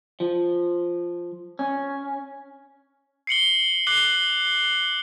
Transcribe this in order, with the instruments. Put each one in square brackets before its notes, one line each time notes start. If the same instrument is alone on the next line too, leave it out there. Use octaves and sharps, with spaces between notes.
[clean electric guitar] F3
C#4
[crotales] C7 C#7 F#7 G7
D6 F#6 C7 F#7 G7